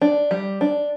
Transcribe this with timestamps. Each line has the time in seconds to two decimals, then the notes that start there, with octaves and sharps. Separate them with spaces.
0.01 D4
0.31 G3
0.61 D4